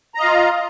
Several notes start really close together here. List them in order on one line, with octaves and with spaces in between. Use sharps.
A#5 D#5 F5 F4